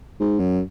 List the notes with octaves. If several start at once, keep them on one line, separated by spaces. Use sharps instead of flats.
G#2
F#2